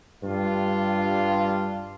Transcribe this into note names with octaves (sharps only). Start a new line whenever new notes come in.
G2 G3 D4 F4